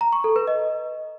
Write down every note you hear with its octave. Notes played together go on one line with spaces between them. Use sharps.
A#5
C#6
A4
B4
D#5